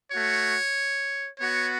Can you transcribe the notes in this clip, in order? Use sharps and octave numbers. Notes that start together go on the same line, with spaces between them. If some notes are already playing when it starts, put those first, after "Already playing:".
A3 F#4 C#5
B3 F#4 C#5